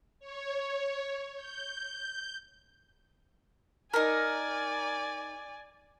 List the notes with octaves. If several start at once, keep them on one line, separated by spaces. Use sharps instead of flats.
C#5
G6
D#4 A#4 D5 G#5